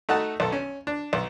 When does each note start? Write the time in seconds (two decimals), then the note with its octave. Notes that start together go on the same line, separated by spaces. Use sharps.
0.09 A3 D#4 F#4 F#5 A5
0.40 B1 A4
0.52 C#4
0.87 D4
1.13 B1